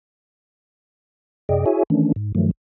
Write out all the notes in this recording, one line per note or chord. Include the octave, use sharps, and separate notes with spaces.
F#2 C3 G#4 D5 D#5 G5
E4 F#4 G#4 C#5 E5 G#5
D#3 E3 A3 C#4 D4
G#2
G2 D#3 F3 F#3 A3